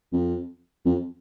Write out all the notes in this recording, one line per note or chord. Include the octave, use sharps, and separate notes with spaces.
F2
F2